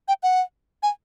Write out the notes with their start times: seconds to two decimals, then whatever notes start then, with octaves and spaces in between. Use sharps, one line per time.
0.08 G5
0.23 F#5
0.83 G#5